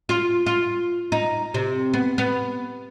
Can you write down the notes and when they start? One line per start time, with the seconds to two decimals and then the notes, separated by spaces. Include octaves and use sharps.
0.09 F4
0.46 F4
1.12 D#4
1.54 C3
1.93 B3
2.18 B3